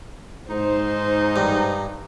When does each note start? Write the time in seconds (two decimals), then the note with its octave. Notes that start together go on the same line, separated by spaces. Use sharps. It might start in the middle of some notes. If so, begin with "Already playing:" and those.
0.50 G#2 D#4 C5
1.36 G2